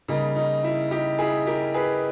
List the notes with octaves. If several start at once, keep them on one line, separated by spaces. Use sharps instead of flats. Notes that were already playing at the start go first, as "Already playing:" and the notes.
C#3 G3 A#3 D#4
D#4
E4
D#4 G4
E4 G#4
G4 A#4
G#4 B4